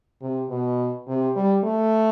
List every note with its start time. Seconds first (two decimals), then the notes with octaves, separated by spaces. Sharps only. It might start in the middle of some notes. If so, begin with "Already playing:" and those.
0.22 C3
0.50 B2
1.08 C3
1.36 G3
1.64 A3